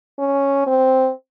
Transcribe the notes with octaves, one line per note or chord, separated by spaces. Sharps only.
C#4
C4